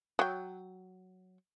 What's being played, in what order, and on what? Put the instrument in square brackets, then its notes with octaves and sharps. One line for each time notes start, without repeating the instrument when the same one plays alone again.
[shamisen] F#3 G5